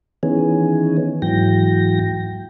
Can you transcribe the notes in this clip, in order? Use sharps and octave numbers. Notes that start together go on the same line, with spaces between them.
D#3 E3 B3 C#4 G#4
G#2 E3 F#3 G5 A#6